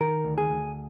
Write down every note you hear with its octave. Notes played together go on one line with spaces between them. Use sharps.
D#3 A#4
D2
G#4
D2